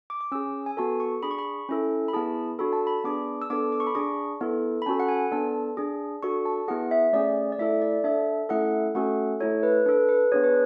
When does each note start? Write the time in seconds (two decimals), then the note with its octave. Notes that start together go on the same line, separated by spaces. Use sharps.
0.10 D6
0.21 D6
0.32 C#4 G#4 E6
0.66 G#5
0.77 B3 F#4 A4 A5
1.00 C#6
1.23 D4 G#4 B5
1.31 C#6
1.38 B5
1.69 C#4 E4 A4
2.08 B5
2.13 B3 E4 G#4 A5
2.59 D4 F#4 A4 B5
2.73 A5
2.87 B5
3.04 B3 D4 G#4 D6
3.42 E6
3.50 B3 D4 A4 D6
3.72 D6
3.80 C#6
3.87 B5
3.95 D4 G#4 C#6
4.41 B3 E4 A4
4.82 B5
4.86 C#4 F#4 A4 A5
5.00 F#5
5.09 G#5
5.32 B3 D4 A4 A5
5.77 D4 G#4
6.23 D4 F#4 A4 C#6
6.45 A5
6.68 B3 E4 G#4 F#5
6.91 E5
7.13 A3 C#4 G#4 D5
7.52 D5
7.59 A3 E4 A4 E5
7.81 D5
8.04 D4 A4 E5
8.49 A3 C#4 E4 A4 F#5
8.95 A3 C#4 F#4 A4 F#5
9.40 A3 E4 A4 C#5
9.63 B4
9.86 D4 B4
9.89 A4
10.09 B4
10.32 B3 D4 G#4 C#5
10.44 B4